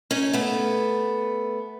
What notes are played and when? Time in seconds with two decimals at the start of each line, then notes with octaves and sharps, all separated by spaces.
0.11 C#4 D#4
0.33 A3 B3